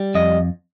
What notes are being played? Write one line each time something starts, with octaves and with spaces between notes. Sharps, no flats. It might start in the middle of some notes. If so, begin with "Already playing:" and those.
Already playing: G3
F2 D#5